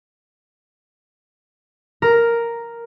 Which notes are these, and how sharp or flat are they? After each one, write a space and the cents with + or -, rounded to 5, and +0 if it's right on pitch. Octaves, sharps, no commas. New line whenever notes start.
A#4 +0